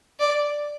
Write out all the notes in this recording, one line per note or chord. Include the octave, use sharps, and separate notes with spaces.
D5